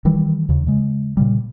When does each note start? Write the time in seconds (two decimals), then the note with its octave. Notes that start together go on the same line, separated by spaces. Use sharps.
0.05 D#3 E3 G3
0.49 D#2 C#3
0.67 C#3 G#3
1.17 A#2 C#3 G3